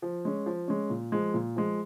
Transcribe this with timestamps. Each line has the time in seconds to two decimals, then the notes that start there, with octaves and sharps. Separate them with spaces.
0.02 F3
0.25 G#3 C#4
0.46 F3
0.68 G#3 C#4
0.90 A#2
1.12 F3 G#3
1.34 A#2
1.56 F3 G#3